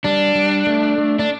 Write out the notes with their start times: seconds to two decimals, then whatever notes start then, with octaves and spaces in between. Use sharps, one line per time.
0.04 G3 D4
0.35 G3
0.67 A3
0.98 A3
1.19 D4